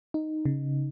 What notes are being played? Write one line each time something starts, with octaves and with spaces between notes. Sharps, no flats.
D#4
C#3